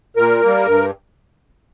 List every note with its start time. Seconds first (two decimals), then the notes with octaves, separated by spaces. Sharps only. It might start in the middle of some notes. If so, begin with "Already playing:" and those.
0.16 A#2 A#4
0.42 G3 A#3
0.66 G2